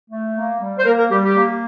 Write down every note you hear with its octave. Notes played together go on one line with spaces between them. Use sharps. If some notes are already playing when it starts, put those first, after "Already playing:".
A3
A#3
G3
C5
A#3 A#4
A#4
G3 G4
G4
A#3